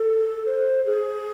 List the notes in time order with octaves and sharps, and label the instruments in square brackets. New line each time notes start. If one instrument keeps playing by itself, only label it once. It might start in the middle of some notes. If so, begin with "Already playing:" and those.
Already playing: [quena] A4
C5
G#4